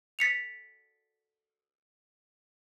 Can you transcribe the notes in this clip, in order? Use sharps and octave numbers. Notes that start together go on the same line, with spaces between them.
A6 B6 C#7 F7